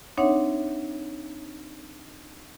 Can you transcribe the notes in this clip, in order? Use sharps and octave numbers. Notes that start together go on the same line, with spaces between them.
C4 D4 D#4 C#5 E5 F#5